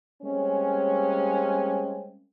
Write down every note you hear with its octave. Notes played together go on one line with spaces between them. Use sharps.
G3 G#3 A#3 C4 C#4